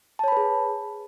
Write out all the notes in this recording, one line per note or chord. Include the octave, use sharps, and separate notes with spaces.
G#4 B4 C#5 A5 B5